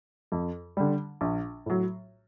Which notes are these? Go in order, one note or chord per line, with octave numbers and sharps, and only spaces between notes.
F2
D3 G3
A#1
A2 F#3